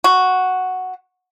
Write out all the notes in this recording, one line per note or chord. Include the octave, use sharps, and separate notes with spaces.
F#4